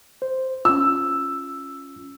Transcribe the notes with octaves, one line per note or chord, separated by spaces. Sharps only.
C5
C#4 F4 E6